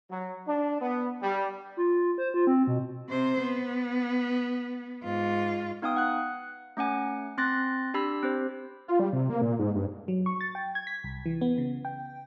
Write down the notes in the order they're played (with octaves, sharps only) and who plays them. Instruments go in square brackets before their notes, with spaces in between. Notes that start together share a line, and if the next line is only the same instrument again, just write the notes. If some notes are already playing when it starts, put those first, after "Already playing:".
[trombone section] F#3
D4
B3
G3
[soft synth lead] F4
C5
F4
C4
B2
[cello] C3 C5
B3
G#2 F4
[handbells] B3 D#4 F5 G5 D#6
F#5 F#6
A3 C#4 F#5 G#5
C4 C6 F#6 A6 A#6
D4 G4 B5 E6
C4 G4 C5
[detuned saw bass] F4
G3
C3
A#3
A#2
G#2
G2
[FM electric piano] F#3
C#6
A6
G5
G#6
B6
C2
E3
B3
C#3
G5